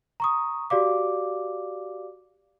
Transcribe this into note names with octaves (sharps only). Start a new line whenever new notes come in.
A#5 C#6 D#6
F#4 G4 D5 F5 D6